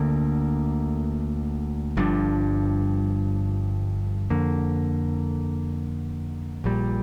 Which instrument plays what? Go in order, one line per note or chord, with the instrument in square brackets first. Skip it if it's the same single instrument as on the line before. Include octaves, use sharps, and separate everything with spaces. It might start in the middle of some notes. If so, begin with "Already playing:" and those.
Already playing: [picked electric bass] D2 D3 A#3
G1 G2 F3 D4
F2 D3 A#3
A#1 A#2 G3